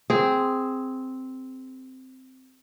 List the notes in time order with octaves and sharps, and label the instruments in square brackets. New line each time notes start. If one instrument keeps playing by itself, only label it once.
[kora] C4 G#4